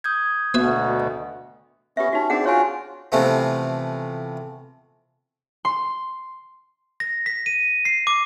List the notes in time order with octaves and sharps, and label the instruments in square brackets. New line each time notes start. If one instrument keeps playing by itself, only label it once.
[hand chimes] D#6 G6 G#6
[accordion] D2 B2 [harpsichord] B3 F#4 E5
[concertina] B3 C#4 [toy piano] G4 E5
[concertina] C#4 [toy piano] D#4 F#4
[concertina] C4 D5 [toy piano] D4 G#4 F#5
[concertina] F4 F#4 [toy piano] C#5 G#5
[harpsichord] C3 E3 F3 A3 B3
[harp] C6
[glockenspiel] A#6
B6
D#7
C7
D6